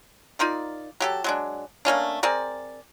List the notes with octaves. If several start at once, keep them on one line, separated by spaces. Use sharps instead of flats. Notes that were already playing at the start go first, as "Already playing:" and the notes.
D#4 F4 A#4 D5
F#3 G4 A4
F#3 G#3 D4
A3 A#3 C#4 D4
C4 G#4 A#4 D5